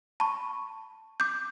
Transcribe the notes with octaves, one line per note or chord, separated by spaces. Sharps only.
A5 B5 C#6
D6 G6